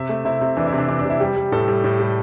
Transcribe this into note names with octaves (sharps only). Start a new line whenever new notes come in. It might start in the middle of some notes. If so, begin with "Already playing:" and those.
Already playing: C3 E5
A3
C3 E4
C3
E3 D4
E4
C3
D4
E3 D4
D4
C3
E4
G3 G4
G3
A2 A4
G3
A2
G3